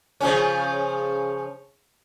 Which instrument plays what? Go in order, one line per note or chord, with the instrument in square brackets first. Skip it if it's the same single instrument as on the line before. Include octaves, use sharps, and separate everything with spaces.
[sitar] C#3 F3 C#4